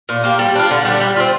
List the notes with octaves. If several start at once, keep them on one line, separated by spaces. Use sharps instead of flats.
A#2
A#3 G4
G3
D4 F4
D3
G3 D4
G3
C4 F4